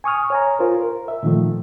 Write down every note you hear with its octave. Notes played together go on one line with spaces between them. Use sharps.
G#5 C#6 D#6 F6
C#5 G#5 A#5
F4 A#4 C5
A#4
E5
A#2 D#3 F3 A3